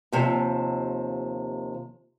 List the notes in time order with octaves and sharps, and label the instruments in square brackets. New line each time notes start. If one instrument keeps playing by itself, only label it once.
[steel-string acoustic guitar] D#2 C3 F3